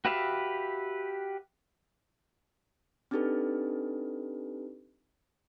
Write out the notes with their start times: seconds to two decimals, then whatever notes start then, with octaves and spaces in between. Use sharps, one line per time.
0.05 F#4 G4 B4 E5 F5
3.11 C4 D4 D#4 G4 A4 B4